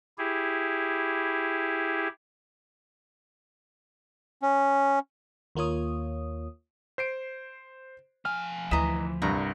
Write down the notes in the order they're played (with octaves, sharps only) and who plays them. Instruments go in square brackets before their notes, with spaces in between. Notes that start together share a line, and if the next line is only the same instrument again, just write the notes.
[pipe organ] E4 G4 G#4
[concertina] C#4
[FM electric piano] D#2 A#3 F4 C#5 D#6
[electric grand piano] C5 C7 D7
[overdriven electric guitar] F3 G#5 [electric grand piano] F6
[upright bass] D2 [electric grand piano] E3 B6 E7 [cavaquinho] D#5 A#5
[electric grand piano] C2 G2 [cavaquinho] A#5